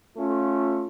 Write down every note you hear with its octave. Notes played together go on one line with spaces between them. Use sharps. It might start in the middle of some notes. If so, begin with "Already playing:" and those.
A3 C#4 F4